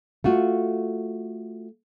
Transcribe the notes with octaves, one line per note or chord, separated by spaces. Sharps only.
A3 F4 F#4